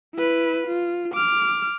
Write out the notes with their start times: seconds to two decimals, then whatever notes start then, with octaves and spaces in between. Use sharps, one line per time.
0.15 E4 B4
0.67 F4
1.14 D6 F6